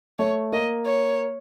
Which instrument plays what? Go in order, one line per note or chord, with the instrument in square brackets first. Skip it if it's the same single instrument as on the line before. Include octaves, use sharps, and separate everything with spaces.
[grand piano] A3 [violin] C#5
[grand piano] A#3 [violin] D#5
[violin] C#5